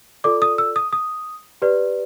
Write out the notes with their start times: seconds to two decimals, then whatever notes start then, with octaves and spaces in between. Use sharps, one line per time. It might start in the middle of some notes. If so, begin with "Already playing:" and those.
0.24 F4 A4 D5 D6
0.42 D#6
0.58 E6
0.76 D#6
0.93 D#6
1.62 G4 B4 D5